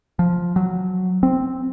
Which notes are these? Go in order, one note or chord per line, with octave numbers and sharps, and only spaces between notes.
F3
F#3
C4